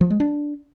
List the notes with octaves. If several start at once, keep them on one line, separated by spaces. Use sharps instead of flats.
F3
G#3
D4